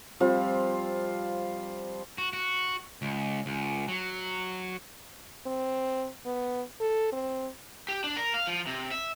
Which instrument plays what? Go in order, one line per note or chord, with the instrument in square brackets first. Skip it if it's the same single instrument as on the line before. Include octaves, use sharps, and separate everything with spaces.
[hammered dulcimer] F3 G3 C4 F4
[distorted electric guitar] F#4
F#4
C#2
C#2
F#3
[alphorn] C4
B3
A4
C4
[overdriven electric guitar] G4
D4
A#4
F5
F3
C3
E5